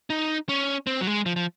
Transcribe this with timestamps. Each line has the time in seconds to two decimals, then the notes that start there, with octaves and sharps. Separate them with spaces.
0.10 D#4
0.49 C#4
0.87 C4
1.01 F#3
1.07 G#3
1.26 F3
1.36 F3